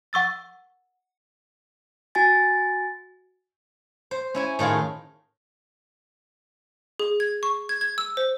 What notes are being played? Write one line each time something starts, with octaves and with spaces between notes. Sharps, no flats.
F#5 C#6 E6 A6
F#4 G#5 A6
C5
C#4 E4 G#5
A2 D#3 F4 G#4
G#4
G#6
C#6
G#6
G#6
E6
C5